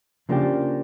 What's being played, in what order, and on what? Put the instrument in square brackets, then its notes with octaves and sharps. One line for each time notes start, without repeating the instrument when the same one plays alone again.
[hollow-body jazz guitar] C#3 F3 A#3 D4 G4